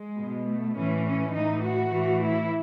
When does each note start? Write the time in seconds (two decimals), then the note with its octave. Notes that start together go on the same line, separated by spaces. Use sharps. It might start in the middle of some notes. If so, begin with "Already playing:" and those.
Already playing: G#3
0.19 B2
0.47 A3
0.76 A2 E3 C#4
1.05 C#4
1.33 A2 E3 D#4
1.61 F#4
1.90 A2 E3
2.20 E4